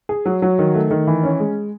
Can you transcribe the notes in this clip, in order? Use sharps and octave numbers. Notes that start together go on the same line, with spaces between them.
G#4
F#3
F#3
D#3
A3
D#3
E3
C#4
G#3